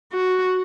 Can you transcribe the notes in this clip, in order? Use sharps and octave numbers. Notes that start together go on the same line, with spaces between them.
F#4